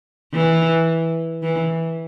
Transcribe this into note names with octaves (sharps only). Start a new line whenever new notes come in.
E3
E3